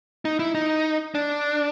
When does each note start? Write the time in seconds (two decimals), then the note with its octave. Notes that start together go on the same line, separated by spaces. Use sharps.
0.25 D#4
0.39 E4
0.55 D#4
1.15 D4